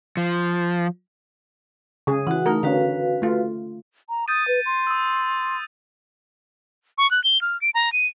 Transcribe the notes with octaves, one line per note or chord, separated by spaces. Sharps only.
F3
C#3 G#4
E3 F#4 F#5
A3 D#4 A#4
D3 C#4 F#4 B4 F5
A3 F4
A#5
D#6 G6 A6 D#7
B4
C6
D#6 E6
C#6
F#6
G7
F6
D7
A#5
D#7